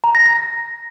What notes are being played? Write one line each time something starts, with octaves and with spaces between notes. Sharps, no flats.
A#5
A#6
A#6